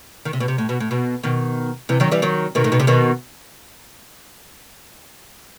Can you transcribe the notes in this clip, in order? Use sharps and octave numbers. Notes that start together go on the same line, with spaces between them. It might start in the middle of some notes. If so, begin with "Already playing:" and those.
D#3
C3
B2
C3
A2
B2
A2
B2
B2 D#3
C3 E3
D#3 F#3
E3 G3
D#3 F#3
B2 D#3
A2
B2
C3
B2 D#3